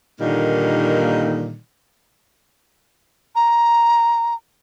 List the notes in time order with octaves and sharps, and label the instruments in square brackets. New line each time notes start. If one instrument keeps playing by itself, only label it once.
[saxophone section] A#2 D3 D#3 G3 A#3 D#4
[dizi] A#5